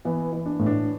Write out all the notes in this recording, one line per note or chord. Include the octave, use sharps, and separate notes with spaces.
E3 B3
E3
D4
A2
D4